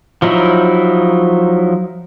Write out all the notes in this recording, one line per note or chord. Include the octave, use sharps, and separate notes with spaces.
F3 F#3 D#4 E4